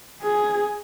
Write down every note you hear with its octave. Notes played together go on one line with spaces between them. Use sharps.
G#4